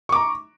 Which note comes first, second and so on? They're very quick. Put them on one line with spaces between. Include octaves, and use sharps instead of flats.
C#6 D6 A#5